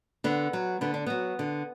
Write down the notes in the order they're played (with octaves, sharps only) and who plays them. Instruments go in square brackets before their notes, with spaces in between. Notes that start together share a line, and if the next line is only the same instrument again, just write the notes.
[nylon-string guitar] D3 B3
F#3
D3 B3
D4
F#3 B3
D3